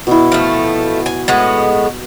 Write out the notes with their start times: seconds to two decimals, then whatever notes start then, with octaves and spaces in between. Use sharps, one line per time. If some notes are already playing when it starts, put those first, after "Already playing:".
0.07 B2 E4
0.32 F3 A3
1.06 G#5
1.28 A2 G#3 B3